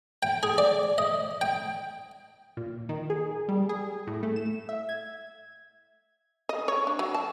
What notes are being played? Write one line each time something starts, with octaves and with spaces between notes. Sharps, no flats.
G5
G#4
D5
D#5
G5
A#2
D#3
G#4
G3
G#4
A2
A3
E7
E5
G#6
D#5
C#5
D4
F#3
A5